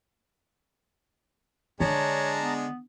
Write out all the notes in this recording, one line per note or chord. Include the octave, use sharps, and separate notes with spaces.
D3 G#3 D4 G#4 C#5 A5 A#5
B3